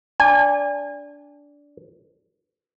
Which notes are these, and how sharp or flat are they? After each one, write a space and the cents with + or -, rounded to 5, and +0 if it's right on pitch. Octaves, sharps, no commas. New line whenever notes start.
D4 -15 G#5 -35